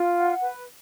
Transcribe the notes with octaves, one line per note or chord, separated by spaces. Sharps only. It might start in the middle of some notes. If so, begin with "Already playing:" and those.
Already playing: F4
F#5
B4